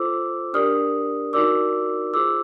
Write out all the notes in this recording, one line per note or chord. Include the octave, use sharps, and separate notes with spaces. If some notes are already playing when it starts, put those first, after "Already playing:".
Already playing: F4 A4 C5 D6 E6
D4 G4 A#4 D5 D#6 F6
D#4 F#4 A#4 D5 D6 E6
F4 G#4 C5 D6 E6